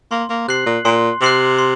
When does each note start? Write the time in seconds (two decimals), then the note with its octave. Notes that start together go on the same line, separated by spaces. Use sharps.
0.11 A#3 C6
0.30 A#3
0.48 C3 F#6 C7 F#7
0.66 A#2
0.84 A#2 C6
1.22 C3 F#6 C7 F#7
1.59 C6